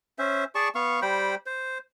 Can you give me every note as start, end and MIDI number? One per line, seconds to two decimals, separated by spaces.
0.19 0.44 61
0.19 0.44 72
0.19 0.44 76
0.55 0.69 68
0.55 0.69 74
0.55 0.69 81
0.55 0.69 85
0.75 1.00 59
0.75 1.00 77
0.75 1.00 85
1.02 1.35 55
1.02 1.35 72
1.02 1.35 79
1.02 1.35 83
1.46 1.78 72